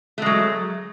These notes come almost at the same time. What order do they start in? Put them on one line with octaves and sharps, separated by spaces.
A3 G#3 F#3